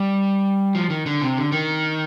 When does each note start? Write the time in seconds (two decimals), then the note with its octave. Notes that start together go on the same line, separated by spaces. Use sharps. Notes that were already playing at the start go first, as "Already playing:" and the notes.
Already playing: G3
0.75 F3
0.90 D#3
1.06 D3
1.22 C3
1.37 D3
1.52 D#3